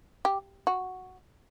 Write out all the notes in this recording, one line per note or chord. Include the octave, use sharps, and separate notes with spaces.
G4
F#4